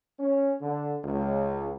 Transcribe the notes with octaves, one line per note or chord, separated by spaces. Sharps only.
C#4
D3
C#2